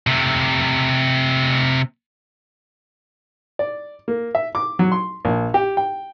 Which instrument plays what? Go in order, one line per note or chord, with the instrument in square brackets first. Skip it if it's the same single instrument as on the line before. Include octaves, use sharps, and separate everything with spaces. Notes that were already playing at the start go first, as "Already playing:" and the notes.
[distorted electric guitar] C3 A3
[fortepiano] D5
A#3
E5
D6
F#3
C6
A#1
G4
G5